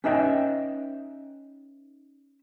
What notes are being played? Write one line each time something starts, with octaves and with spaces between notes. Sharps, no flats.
C#4 D#4 B4 D#5 E5 G5